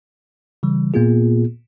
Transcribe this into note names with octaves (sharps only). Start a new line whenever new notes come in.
C#3 E3 G3
A#2 A#3 B3 F4 G#4